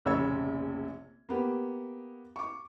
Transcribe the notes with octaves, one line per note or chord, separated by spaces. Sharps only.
F1 A#1 C#3 C#5 E6 G#6
A#3 B3 G4
C#6 D6